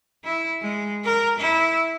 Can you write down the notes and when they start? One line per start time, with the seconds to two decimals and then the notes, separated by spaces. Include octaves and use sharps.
0.24 E4
0.62 G#3
1.04 A#4
1.38 E4